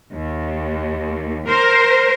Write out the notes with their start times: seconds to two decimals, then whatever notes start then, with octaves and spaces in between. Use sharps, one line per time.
0.13 D#2
1.48 A#4 C5